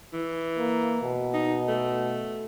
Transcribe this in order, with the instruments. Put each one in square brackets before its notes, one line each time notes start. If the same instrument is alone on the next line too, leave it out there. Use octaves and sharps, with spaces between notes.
[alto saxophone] E3
[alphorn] A#3
B2
[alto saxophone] D#4
A3